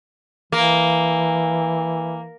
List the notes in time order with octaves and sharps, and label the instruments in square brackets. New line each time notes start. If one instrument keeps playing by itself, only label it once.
[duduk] E3 [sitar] A#3